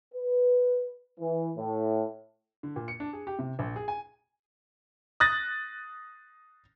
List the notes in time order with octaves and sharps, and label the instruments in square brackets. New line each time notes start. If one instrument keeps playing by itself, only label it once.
[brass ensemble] B4
E3
A2
[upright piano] D3
A#2
C#7
D4
G#4
G4
C3
A#1
G#4
G#5
[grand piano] D#6 F#6 A6 A#6